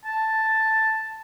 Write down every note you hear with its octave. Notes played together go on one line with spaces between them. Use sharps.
A5